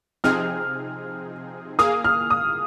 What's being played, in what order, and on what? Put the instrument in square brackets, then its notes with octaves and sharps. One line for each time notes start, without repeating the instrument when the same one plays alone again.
[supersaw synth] C3 F3 C4 D#4 G#4 [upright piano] F6
[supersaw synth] A#3 G#4 F5 [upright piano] D#6
[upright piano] F6
D#6